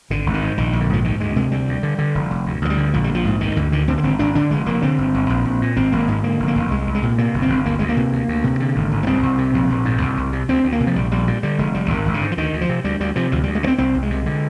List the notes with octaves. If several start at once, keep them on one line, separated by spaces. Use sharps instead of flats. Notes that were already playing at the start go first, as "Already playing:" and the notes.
G#1 D3
G#1
D#3
G#2
A#1 D#3
A#1
D3
G#2 F3
D2 D#3
D2 G#3
C3 G#3
D2 G3
D2
D3
D3
F1
F1
D2
D2 F3
G3
D3
A#1 F3
G3
A#1
F3
G#2
D2 D#3
D2 D3
D3 D#3
D3 C4
A#3
G#1 C4
G#1 D4
D3 D4
F1 G#3
F1 A#3
D3 C4
G1
G1
A#1
A#1
A#2
G#1 C4
G#1 A#3
G#2 G#3
D3 A#3
F1
A#3
F1
C2 G#3
C2
G#3
A#2
C3 A#3
G1
C4
G1
D2 A#3
D2 G#3
A#3
C3
D2
D2
C3
D3
G#1
G#1
A#3
C2 C4
C2
C3
A#1
A#1
G#2
C2
C2
C3
D2 C4
D2
A#3
C3
F3
A#1 G3
A#1 G3
A#2 G3
D3 G3
F1 G#3
F1 G3
G#1 D#3
G#1
D3
G#2
F3
D2 D#3
D2
F3
C3
D2 G3
D2 G3
C3 F3
D2 F3
D2 G3
G#3
D3
C4
C2 C4
C2
G#3
C3
D3